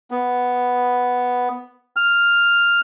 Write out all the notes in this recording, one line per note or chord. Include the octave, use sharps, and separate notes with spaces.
B3
F6